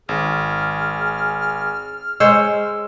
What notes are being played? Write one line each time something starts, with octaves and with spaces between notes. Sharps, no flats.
G#1 G#4 F6
G#3 C5 C#5 E6